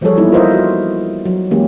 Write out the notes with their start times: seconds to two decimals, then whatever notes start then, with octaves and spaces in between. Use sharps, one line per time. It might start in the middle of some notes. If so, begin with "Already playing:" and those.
0.01 E3 F3 G3 G#4 A4 C#5
0.17 E3 G3 A#3 B3 D#4 E4
0.32 F4 A#4 C5 D#5 E5
0.51 F#4
1.25 F#3
1.51 E3 G#3 A#3 C#4 G4